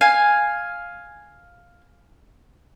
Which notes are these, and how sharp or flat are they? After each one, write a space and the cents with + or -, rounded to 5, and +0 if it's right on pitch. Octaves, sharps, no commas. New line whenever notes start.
F5 +5 G#5 +0